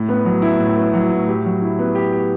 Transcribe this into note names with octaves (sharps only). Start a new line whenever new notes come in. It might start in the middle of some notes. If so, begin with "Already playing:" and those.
Already playing: A2
B3
F#3
E4
A2
B3
F#3
A2
G4
F#3
E4
B3
G4
G4